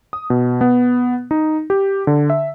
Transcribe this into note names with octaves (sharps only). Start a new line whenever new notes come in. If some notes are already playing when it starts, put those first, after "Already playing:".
D#6
B2
B3
D#4
G4
D3
E5